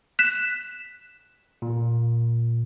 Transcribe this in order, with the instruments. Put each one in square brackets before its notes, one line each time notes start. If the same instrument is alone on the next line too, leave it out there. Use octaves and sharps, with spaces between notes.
[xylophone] F#6 B6 E7
[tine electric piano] A#2